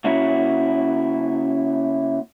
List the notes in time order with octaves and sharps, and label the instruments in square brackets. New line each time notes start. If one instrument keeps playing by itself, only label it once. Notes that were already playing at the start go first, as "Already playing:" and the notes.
[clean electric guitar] C#3 A#3 C#4 E4 F#4